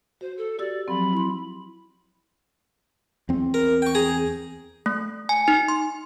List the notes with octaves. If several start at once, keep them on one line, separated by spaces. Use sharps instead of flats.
F#4 C5
A4
F#4 G4 D5 E6
F3 F#3 C4 B5
E4 C6
E2 C4
A#4
G5 C#6
G#4 A#5
A3
G#5
D#4
C6